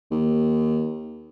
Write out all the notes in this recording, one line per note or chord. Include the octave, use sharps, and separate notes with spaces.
D#2